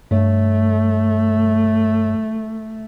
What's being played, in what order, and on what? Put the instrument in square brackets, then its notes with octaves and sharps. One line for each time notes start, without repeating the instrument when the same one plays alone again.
[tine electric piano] G2 C#5 [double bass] A3